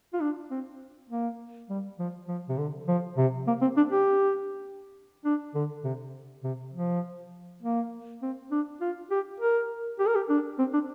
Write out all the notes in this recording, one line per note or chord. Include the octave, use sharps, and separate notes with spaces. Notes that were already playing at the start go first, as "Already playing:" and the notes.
F4
D4
C4
A#3
G3
F3
F3
C3
D3
F3
C3
A#3
C4
D4
G4
D4
D3
C3
C3
F3
A#3
C4
D4
F4
G4
A#4
G4
A#4
G4
D4
C4
D4